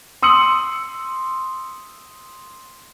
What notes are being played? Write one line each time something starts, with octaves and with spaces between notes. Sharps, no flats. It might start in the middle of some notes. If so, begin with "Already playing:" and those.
C6 D#6 E6 C#7 F#7